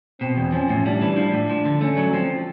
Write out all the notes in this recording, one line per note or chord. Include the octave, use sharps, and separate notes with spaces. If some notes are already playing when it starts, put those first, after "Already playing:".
B2 C4
E2
F3 C#4
A2
G3 D4
E3
F3 D4
A2
F3
D3
A3 C#4
F#3
F3 C4